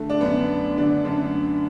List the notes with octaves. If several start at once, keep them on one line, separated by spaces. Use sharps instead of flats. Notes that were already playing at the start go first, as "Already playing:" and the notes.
Already playing: D3 A3
D4
F#2 D3 B3
D3 D4
F#2 D3 D4